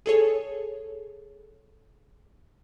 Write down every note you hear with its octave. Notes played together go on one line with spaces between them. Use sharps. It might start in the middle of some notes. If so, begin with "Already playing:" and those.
G#4 A4 C#5